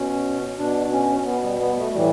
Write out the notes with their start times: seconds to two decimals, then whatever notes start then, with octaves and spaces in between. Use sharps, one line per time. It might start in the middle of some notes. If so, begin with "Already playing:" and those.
Already playing: B2 C#4
0.58 B2 D4
0.92 C#4
1.26 B2 B3
1.43 G3
1.60 B3
1.77 A3
1.94 A2 E3 G3